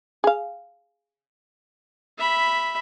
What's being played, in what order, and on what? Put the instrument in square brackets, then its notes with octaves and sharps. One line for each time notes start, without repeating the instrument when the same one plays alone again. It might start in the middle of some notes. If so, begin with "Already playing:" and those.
[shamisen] G#4 F5
[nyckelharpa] E5 B5